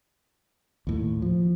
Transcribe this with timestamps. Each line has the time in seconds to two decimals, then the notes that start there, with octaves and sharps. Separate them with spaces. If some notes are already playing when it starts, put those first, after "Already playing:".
0.87 D#2 A2
1.22 F3